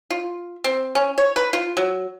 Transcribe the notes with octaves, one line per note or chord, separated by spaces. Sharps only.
F4
C4
C#4
C#5
B4
F4
F#3